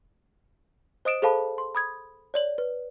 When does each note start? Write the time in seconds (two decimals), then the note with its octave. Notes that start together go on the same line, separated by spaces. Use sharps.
1.05 C5 D#5 D#6 D7 E7
1.22 G#4 A4 C5 F5 A5 B5
1.58 C6
1.75 B5 D#6 G#6
2.34 C#5 D5 F#7
2.58 B4